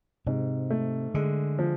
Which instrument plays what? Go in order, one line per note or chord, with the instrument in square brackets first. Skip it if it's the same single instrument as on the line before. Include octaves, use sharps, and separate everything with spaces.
[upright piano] G#2 [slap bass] C3
[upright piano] A3
[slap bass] D3 [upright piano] G#3
[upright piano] F3